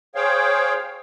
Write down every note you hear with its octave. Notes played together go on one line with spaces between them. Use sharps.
G#4 C5 C#5 F5 G5